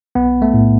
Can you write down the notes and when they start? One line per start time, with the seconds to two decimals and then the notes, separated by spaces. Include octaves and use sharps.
0.15 B1 B3
0.42 A3
0.54 A2